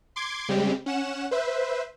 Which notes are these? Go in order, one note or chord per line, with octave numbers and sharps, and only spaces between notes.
C6 D6 G#6
C#3 G3 G#3 C4 G4
C#4 F#5 E7
B4 C5 E5